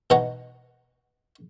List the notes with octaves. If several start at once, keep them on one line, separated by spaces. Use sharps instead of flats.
B2 E3 D#4 C#5 F#5 A#5